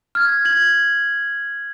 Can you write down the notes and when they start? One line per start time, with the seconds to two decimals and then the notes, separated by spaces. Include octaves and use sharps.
0.15 F6 G#6
0.45 G#6 F#7